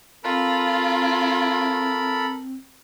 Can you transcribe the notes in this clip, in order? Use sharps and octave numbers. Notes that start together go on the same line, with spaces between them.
C4 F4 A4 A#4 B5